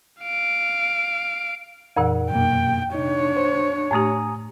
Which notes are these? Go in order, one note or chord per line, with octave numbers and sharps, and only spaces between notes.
F5 D7
F2 A#2 E3 A#4 F#5
F#2 B2 A#3 G5
C3 D4 D#4 C#5
C5
A2 A3 G4 G#5 A#5 D#6